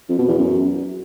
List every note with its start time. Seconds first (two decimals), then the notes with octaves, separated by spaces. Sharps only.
0.09 F2
0.18 B2
0.28 E2
0.37 F#2